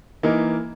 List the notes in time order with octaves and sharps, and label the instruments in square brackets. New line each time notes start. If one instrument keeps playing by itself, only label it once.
[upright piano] E3 A#3 D#4 A#4